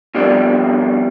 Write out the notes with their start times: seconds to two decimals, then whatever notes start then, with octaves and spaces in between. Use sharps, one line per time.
0.15 B2 F3 G3 C4 D4